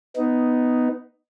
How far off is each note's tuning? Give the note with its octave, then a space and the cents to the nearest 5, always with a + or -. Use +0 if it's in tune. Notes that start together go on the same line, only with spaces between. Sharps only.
B3 +10 D#4 +0